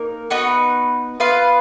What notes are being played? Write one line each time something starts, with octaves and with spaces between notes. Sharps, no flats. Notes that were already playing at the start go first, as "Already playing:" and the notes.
Already playing: A#3 D#4 A#4
B3 D#4 F#4 B4
B3 F4 B4 F5